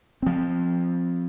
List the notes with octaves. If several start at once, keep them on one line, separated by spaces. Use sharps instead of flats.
F3 C4